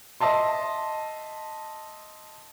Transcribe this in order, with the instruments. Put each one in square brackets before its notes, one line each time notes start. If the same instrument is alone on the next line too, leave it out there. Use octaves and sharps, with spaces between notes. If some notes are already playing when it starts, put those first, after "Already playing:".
[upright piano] D#5 E5 A5 C6